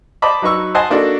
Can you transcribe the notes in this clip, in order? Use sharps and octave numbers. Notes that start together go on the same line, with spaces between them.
C5 D5 D#5 A5 B5 D6
F#3 D#4 B4 C#6 E6
C5 D#5 F#5 G#5 A5 C6
A#3 D4 D#4 F#4 A4